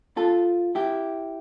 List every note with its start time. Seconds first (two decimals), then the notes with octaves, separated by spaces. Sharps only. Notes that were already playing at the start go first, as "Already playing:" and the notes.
0.17 F4 A4
0.75 E4 G4